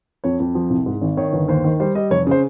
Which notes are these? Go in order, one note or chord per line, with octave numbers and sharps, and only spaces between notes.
F2 C#5
F2
F3
C2
G#2
G#1
D#3 C#5
G1
D#2 C5
D#3
G3 C5
G3 D#5
F1 C#5
C#3 C5